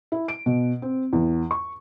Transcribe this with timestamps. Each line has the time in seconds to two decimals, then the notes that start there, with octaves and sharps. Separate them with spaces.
0.12 E4
0.28 D7
0.46 B2
0.82 C4
1.13 E2
1.51 C#6